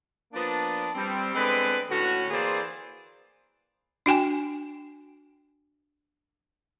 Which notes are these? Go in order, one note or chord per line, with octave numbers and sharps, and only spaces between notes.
F3 A#3 B3 D4
G3 C4
D3 G#3 B3 C4 B4
A2 D3 C#4 F#4
E3 A#3 C4 G#4 C5 D5
D4 F#4 G5 G#5